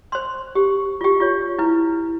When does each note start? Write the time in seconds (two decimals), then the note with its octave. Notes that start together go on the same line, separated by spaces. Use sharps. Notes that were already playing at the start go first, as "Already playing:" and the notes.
0.12 C5 C6
0.55 G4
1.01 F4 G4
1.20 F4 C#5
1.59 E4 B4